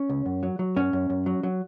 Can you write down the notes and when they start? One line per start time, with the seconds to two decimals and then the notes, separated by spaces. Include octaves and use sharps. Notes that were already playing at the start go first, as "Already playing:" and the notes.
Already playing: C#4
0.09 C#2
0.26 F#2
0.43 F#3
0.59 F#3
0.76 F#2 C#4
0.93 F#2
1.10 F#2
1.26 F#3
1.43 F#3